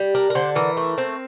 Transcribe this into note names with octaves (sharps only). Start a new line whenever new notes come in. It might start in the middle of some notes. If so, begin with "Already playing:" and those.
Already playing: G3
D4 A#4
A#4
D3 C5
E3 A#4
A3
C4